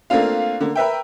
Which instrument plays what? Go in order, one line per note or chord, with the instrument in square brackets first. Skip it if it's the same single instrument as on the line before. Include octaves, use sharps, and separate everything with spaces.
[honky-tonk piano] A3 A#3 C4 D4 F4 F5
D3 A#3
A#4 B4 E5 G5